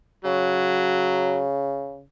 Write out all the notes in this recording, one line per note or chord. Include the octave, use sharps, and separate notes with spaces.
C#3 F#3